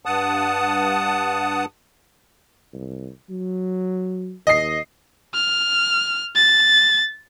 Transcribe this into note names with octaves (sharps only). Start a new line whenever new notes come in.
G2 F#5 A5 D#6
C2
F#3
D#2 D#5 C7
F6
A6